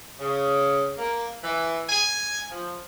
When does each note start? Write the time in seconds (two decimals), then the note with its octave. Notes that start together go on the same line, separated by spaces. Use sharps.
0.20 C#3
0.98 A#3
1.44 E3
1.89 G#5
2.51 F3